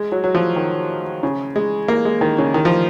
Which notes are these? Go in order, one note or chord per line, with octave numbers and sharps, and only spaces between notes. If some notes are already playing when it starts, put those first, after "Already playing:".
Already playing: G#3
F#3
F#3
F3
D#3
C#3
G#3
A#3
G#3
D#3
C#3
D#3
F3